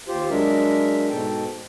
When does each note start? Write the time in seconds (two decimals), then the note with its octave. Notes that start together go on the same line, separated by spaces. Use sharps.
0.08 D#2 F4 G4 C5
0.30 F#3 G#3 D4 A#4 E5
1.09 G#2 B2 A4 G5